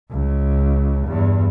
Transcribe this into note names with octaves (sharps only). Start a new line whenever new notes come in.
C#2
E2 G2